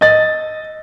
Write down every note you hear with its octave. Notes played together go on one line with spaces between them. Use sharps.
D#5 A6